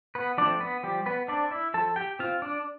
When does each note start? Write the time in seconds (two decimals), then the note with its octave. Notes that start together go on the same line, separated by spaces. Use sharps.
0.15 B3 B4
0.38 F3 A3 C4 D4 D5
0.61 B3 B4
0.83 F3 G3 G4
1.06 B3 B4
1.28 C4 D4 D5
1.51 E4 E5
1.74 F3 A4 A5
1.96 G4 G5
2.19 C4 F4 F5
2.42 D4 D5